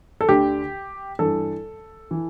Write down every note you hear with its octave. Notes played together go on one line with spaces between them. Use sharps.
A4
D2 D3 G4
G2 E3 A4
E3